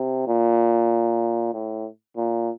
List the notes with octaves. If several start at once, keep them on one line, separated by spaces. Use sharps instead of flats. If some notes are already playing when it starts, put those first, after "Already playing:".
Already playing: C3
A#2
A2
A#2